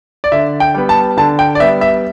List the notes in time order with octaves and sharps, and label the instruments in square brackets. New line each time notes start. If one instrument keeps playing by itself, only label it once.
[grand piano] D5
D3 E5
G5
G3 B3
A5
D3 A5
G5
D5
G3 B3 E5
E5